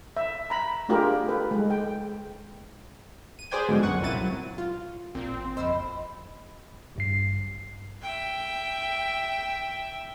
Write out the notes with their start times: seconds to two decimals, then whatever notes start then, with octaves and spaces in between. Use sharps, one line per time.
0.17 E5
0.50 A#5 B5
0.89 A3 D4 F4 G4 G#4 A#4
1.28 A4 B4 G5
1.51 G#3
1.70 G5
3.39 D#7
3.51 G#4 B4 C5 D5 G5 G#5
3.69 G#2 B2 D3 F3 G#3
3.83 A#1 F#2 F#5 C#6
4.01 C2 A#2 C4 E4 A6 D#7
4.15 F#3
4.58 F4
5.15 A1 A#2 C4
5.57 F#1 F2 C5 D#5 B5 E6
6.96 A1 G2 C7
8.01 E5 G5